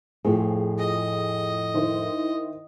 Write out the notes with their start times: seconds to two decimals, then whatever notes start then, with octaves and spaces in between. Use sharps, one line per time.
0.25 F2 A2 C4 F4 G#4
0.79 D#5
1.74 D#3 E4 C5